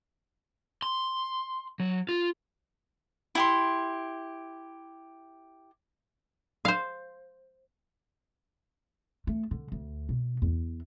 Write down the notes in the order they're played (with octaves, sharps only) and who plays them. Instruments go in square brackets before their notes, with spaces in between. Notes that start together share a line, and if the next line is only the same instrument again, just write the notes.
[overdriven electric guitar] C6
F#3
F4
[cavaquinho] E4 G4 C6
[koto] C5 F5
[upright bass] A3
D3
D2
B2
E2